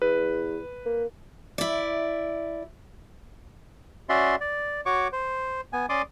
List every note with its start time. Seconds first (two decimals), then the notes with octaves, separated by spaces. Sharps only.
0.02 E2 B4
0.85 A#3
1.58 E4 D5
4.09 C#4 F#4 D5 E5 C6
4.41 D5
4.86 F#4 C#5 C#6 D6
5.12 C5
5.73 B3 G#5
5.89 C#4 D5 C6 D6 D#6